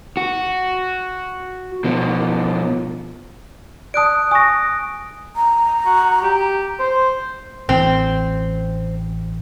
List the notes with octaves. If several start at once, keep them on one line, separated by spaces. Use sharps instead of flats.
F#4
B2 F3
D5 A5 D#6 F#6 D7
G#5 C#6 D#6 A#6
A#5
F#4
G4
C5
A1 C4